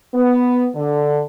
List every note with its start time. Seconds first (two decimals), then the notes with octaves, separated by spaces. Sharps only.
0.14 B3
0.75 D3